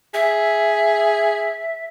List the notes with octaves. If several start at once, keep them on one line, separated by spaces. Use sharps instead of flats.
G#4 E5